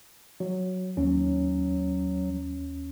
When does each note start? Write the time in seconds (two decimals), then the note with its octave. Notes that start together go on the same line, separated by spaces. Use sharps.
0.40 F#3
0.97 D#2 F#3 C#4